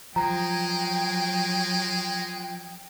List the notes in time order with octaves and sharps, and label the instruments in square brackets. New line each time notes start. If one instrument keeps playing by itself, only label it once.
[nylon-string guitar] F3 [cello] F#3 G5 [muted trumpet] G#3 [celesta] A#5